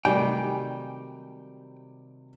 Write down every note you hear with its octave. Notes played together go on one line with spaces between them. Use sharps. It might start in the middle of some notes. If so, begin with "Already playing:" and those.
C3 D#3 F#3 G3 A3 G5 G#5